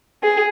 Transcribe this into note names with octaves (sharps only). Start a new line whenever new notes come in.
G#4